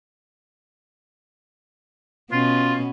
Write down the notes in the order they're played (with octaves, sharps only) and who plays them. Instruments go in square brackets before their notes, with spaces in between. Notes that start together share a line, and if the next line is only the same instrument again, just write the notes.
[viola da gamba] B2 B3 C#4 [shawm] F4